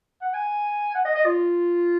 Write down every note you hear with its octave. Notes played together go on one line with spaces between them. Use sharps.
F#5
G#5
F#5
D#5
D#5
F4